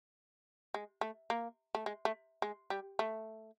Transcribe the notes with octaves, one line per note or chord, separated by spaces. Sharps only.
G#3
A3
A#3
A3
G#3
A3
G#3
G3
A3